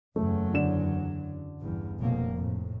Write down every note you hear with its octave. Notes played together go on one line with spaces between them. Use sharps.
F#1 E2 F#3 A3
D3 D5 E7
A1 E2 G2
F1 B2 A#3
F2 A2